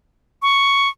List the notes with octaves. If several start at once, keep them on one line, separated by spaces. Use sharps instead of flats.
C#6